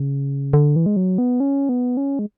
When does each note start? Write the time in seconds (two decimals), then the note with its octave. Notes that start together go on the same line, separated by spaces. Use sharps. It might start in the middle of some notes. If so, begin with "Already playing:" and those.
Already playing: C#3
0.53 D3
0.76 E3
0.86 G#3
0.96 F#3
1.18 B3
1.40 C#4
1.69 B3
1.97 C#4
2.19 G#3